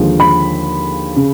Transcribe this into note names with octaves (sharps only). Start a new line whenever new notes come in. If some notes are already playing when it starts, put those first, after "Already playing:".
Already playing: D#2 D3 F3 G#3
B5
C#3